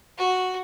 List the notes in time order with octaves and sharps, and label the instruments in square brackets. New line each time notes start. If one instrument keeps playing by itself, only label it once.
[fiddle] F#4